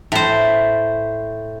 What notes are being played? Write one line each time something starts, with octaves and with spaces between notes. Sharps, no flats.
A2 C5